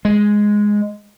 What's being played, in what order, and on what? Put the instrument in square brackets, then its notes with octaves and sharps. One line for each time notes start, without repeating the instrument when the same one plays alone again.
[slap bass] G#3